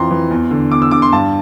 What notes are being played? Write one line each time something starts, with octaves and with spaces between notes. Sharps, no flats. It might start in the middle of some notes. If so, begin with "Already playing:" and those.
Already playing: F2 E3 A#5 C6
E3
E2
D3
E2 D6
E6
D3 D6
C6
G2 A5